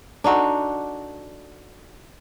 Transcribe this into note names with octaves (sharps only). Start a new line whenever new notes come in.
D4 D#4 F#4 A4